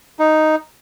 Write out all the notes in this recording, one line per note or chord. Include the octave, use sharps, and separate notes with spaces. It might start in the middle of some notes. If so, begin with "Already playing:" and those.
D#4